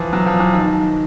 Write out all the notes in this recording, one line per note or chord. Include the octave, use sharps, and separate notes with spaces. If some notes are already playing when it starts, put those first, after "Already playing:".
Already playing: E3 F3
F#3
F3
E3
D#3